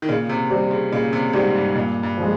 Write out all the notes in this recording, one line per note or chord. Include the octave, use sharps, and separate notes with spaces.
D#3
A#2 C#3
C3
G3 C4 G4
C#3
A#2 C#3
C3
G#2 G3 C4 G4
G2
G2 A#2
G2
F3 G#3